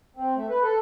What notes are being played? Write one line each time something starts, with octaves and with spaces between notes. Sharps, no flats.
C4
A3
B4
A4